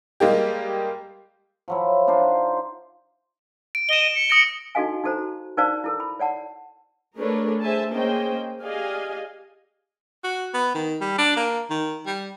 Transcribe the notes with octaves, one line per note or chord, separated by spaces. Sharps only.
G3 G#3 A#3 G4
F3 F#3 E4
D4 D#4 F4 C5
D7
D#5 E7 G7
C#7
D#6 A#6 D7
D#4 F#4 A4 D#5 F5 G#5
D#4 F#4 A4 C5 A#5
D#4 A#4 C5 D5 F5 A5
E4 A4 A#4
B5
C#5 D5 F#5 A5
A3 D4 G#4 A#4 B4 C#5
G#4 C5 E5 G#5 A5
A#3 C#4 G#4 C5 D#5 G5
G4 G#4 D5 D#5 F5 G#5
F#4
B3
D#3
G3
D4
A#3
D#3
G3